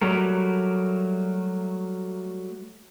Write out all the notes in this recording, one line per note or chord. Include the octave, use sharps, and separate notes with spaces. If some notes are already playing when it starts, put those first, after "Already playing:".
F#3 G3 A3 A#4